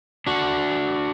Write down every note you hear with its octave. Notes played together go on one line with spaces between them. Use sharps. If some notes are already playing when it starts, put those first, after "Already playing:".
D4 F#4